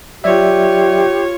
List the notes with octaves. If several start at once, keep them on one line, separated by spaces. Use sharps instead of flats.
F#3 F4 G4 C#5 D5 E5